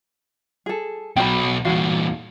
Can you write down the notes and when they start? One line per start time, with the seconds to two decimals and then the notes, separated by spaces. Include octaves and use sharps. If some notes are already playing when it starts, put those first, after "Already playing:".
0.66 G#4 A4
1.16 B1 B2 G5 B5
1.65 E2 A#2 F#4 F5